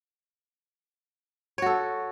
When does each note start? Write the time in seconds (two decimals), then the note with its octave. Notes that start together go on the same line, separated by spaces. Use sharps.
1.58 C#5
1.62 F#4
1.66 A4